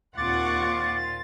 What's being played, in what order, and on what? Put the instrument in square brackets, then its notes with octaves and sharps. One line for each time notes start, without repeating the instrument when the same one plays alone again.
[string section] D#2 F#5 C#6 [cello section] A#2 C4 F4 [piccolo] D6 [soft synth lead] A6